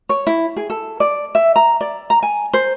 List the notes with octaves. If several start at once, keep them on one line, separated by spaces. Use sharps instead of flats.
C#5
E4
G#4
A4
D5
E5
A#5
D5
A#5
G#5
C5